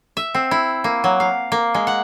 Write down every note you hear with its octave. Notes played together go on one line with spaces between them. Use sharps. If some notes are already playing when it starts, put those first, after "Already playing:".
E5
C4
E4
A#3
F#3
F5
A#3
G#3
F#5